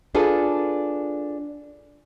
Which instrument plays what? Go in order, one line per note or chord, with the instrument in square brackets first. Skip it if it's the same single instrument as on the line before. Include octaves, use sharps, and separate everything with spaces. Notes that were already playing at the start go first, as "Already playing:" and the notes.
[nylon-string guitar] D4 F4 G#4 A4 B4